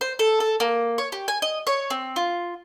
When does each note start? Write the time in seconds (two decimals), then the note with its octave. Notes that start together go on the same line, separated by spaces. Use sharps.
0.01 C5
0.19 A4
0.40 A4
0.60 A#3
0.98 C#5
1.12 G4
1.28 G#5
1.42 D#5
1.67 C#5
1.90 C4
2.16 F4